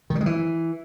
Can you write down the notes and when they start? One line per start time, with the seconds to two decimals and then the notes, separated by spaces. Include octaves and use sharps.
0.10 D#3
0.15 G3
0.21 G#3
0.26 E3